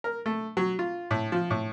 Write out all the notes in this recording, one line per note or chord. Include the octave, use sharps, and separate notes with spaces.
A#4
A3
F#3
F4
A2
F3
A2